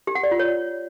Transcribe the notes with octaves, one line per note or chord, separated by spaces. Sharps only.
G4
F#5
D5
F4
C#5